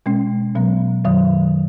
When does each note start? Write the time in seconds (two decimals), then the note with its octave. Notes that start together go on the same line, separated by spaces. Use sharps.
0.06 B2 G#3 C#4
0.55 B2 F#3 B3
1.05 F#2 D#3 F#3